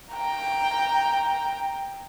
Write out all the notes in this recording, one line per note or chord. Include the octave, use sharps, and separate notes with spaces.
G5 A#5